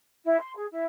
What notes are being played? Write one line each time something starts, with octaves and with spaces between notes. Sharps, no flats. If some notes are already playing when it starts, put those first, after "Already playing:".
E4
C6
G#4
E4